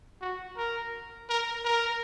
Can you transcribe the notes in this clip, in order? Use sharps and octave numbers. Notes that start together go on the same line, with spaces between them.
F#4
A#4
A#4
A#4